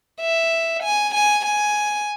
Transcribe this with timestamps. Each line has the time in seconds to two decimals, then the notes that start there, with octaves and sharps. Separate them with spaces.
0.20 E5
0.83 G#5
1.14 G#5
1.45 G#5